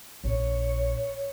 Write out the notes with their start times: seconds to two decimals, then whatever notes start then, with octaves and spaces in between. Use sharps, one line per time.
0.24 A#1 C#5